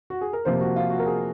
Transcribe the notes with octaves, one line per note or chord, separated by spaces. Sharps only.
F#4
G#4
A#4
C3 F3 A#3 C5
F#4
F4
F#4
A#4
G#4